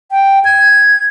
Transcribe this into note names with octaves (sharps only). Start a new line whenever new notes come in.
G5
G#6